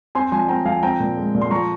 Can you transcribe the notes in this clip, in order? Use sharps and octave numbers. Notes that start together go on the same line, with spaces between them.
C4 G#5 C6
F3 G#5 C6
C4 G5 A#5
F3 F5 G#5
G#5
C4 G5 A#5
A#2
G#3
A#2
C6
F3 A#5 C#6